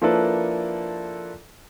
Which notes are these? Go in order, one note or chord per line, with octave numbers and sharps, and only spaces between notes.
F3 A#3 D4 E4 A4 B4